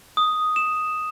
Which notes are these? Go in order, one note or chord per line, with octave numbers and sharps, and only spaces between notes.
D#6
E7